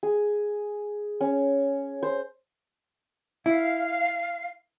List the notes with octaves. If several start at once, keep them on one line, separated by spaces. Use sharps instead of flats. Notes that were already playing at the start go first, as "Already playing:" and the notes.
G#4
C#4
C5
E4 F5